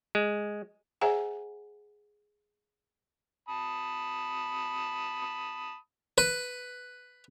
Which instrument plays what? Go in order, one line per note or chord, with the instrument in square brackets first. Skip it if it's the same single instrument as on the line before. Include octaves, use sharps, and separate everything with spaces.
[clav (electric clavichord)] G#3
[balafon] G#4 C5 E5 F#5 G#5 A#5
[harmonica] A5 B5 D#6
[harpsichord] B4